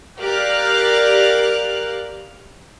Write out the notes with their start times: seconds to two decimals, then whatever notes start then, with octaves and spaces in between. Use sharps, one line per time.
0.19 G4 A#4 D5 F5 F6 F#6